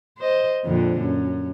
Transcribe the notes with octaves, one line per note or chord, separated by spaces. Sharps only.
C5 D#5
F2 A#2 D3
F#2